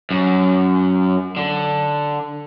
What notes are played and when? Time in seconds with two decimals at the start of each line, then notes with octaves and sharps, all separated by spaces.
0.11 F#2
1.37 D3